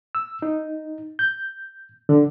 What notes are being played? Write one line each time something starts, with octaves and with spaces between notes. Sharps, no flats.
E6
D#4
G6
D3